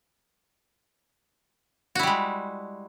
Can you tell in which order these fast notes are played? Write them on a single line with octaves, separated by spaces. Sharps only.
F#4 E4 G3 G#3